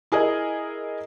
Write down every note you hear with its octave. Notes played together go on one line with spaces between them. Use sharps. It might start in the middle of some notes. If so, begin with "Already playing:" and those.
E4 G#4 A#4 D#5